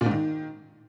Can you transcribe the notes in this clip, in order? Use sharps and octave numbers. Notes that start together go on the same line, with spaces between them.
A#2
G#2
D#3